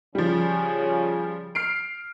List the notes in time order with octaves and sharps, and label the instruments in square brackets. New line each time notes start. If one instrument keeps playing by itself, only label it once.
[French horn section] C#3 [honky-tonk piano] F3 G3
[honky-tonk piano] F6 C7 D7